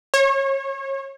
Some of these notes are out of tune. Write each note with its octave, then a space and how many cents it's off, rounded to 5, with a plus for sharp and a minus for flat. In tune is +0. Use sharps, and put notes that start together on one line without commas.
C#5 -30